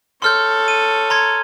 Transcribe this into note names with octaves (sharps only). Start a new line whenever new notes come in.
A4 C#5 C6 F6 G6
D#7
A#5 C6 G#6